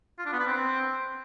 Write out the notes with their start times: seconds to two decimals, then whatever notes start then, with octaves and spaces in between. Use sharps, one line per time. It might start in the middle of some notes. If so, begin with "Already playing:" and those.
0.19 F4
0.26 D4
0.32 B3
0.39 B4
0.46 C4